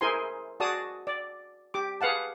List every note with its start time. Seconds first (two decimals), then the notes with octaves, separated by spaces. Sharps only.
0.01 E4 G#4 A#4 C5 G#5 C6
0.60 F#4 G#4 D5 A5 D#6
1.07 D5
1.74 G4 D6
2.01 G#4 B4 F5 F#5 A5